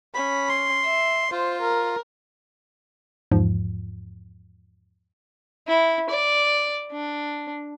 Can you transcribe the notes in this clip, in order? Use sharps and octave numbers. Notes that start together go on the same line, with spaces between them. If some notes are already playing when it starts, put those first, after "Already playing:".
C#4 B5
C6
E5
F4 C5
A#4
E2 G#2 F3
E4
D5
D4